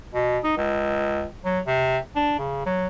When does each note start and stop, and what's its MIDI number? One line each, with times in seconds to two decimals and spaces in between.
0.14 0.38 47
0.44 0.52 63
0.57 1.26 37
1.45 1.60 54
1.66 1.98 48
2.16 2.34 62
2.39 2.66 49
2.66 2.88 54